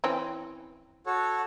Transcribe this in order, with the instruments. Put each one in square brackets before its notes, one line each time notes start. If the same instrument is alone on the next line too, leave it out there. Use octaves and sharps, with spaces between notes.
[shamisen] E3 C4 C#4
[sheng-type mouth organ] F#4 A4 C#5